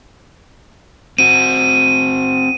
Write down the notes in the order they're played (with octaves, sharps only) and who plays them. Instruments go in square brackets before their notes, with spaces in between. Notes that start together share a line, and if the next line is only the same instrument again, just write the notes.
[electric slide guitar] C4 F#4 [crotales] D#7